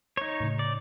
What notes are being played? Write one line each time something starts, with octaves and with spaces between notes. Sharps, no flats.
D#4 C#5
A2 C#3
D5